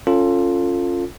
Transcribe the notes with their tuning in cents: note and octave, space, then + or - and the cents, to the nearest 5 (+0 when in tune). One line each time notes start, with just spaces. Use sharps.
C#4 -10 F4 +0 A4 +20